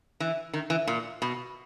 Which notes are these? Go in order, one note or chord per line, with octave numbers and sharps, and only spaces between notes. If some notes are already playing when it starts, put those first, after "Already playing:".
E3
D#3
E3
A#2
B2